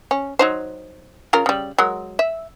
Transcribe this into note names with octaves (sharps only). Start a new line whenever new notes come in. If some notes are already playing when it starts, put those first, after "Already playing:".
C#4
F#3 D#4 C5
C#3 F4 A#4
C#3 G3
F#3 G#3 A#4
E5